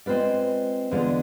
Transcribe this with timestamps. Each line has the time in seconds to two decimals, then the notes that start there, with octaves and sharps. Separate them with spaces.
0.06 G#3 C4 F4 B4 D5
0.91 E2 D3 G#3 D4 F4